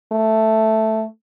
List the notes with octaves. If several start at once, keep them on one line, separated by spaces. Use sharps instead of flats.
A3